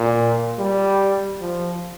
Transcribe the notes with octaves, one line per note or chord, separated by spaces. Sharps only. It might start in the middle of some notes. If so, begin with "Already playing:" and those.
Already playing: A#2
G3
F3